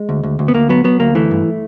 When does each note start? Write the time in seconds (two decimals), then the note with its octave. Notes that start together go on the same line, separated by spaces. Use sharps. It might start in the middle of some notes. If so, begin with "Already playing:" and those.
Already playing: G#3
0.09 D2
0.23 D2
0.39 D2
0.48 B3
0.54 D2 A#3
0.69 F#3 B3
0.84 F#3 B3
1.00 D2 A#3
1.15 E3 A3
1.31 G2